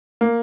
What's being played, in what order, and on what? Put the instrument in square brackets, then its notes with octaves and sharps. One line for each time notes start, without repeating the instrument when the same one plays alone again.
[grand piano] A#3